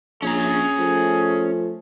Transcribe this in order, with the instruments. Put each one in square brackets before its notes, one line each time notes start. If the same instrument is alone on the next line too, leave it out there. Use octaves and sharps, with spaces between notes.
[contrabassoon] A#1 [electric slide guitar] C#4 C#5 A#5 [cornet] G#4
[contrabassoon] F3 [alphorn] A3